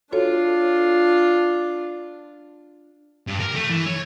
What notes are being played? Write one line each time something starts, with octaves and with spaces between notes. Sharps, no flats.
D4 F4 F#4 A4 C#5
G2
A#4
A3
E3
C#5